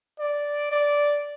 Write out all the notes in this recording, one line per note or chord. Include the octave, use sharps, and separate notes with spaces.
D5
D5